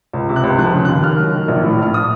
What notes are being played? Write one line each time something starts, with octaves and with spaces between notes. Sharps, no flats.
C#2
C3
F#6
C#2
F3 F#6
C#3
D#2 F#6
D#3 F6
F#3
D#3
A#1
A2
A#1 F6
D#6